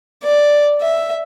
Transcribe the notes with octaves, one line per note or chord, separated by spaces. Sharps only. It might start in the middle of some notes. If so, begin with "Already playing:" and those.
D5
E5